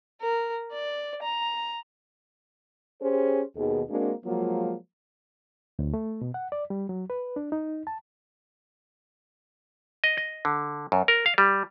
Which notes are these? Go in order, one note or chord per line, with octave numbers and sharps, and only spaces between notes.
A#4
D5
A#5
C#4 G4 G#4 C5
D#2 B2 D#3 G#4
G#3 A#3 C4 D4 F#4 A#4
F3 F#3 G#3 A#3 F4
D2
A3
B2
F#5
D5
G3
F#3
B4
D4
D#4
A5
D#5
D#5
D3
F#2
A#4
F5
G3